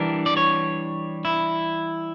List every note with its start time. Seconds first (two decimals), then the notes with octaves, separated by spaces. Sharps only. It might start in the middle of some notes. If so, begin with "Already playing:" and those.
Already playing: E3 G3 D4 A#4
0.26 D5
0.37 C#5
1.25 E4